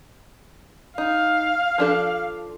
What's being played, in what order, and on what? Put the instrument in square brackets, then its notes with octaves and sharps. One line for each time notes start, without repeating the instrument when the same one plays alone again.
[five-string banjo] D#4 [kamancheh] F5
[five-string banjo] F3 D4 A4